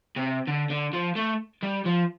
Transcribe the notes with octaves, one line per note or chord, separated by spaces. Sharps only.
C3
D3
D3
F3
A3
G3
F3